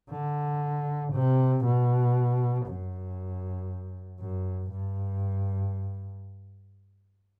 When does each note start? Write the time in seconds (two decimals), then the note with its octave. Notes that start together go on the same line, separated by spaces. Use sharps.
0.11 D3
1.13 C3
1.65 B2
2.66 F#2
4.20 F#2
4.71 G2